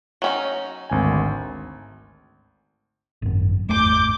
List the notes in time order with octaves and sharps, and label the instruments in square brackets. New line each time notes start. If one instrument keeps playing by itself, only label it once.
[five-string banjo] F#3 C#4 D#4
[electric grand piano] G#1 D2 G#5
[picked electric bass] G#1 F#2
[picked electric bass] G#1 E2 A3 [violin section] D6 G6